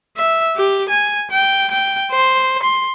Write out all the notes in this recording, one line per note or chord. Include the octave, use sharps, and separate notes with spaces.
E5
G4
G#5
G5
G5
C5
C6